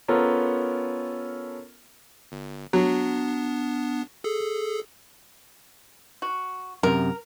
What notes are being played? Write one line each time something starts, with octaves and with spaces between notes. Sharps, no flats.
B3 C#4 F4 A4 A#4
G1
F#3 B3 D4
G#4 A4
F#4
F#2 C3 A#4